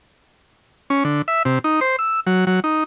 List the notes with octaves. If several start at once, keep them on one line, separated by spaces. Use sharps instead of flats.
C#4
D3
E5
C3
D#4
C5
E6
F#3
F#3
D#4